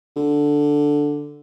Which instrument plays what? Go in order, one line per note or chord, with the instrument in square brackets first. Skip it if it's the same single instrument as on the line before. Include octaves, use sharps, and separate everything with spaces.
[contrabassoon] D3